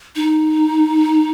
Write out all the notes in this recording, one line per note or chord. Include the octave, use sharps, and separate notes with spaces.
D#4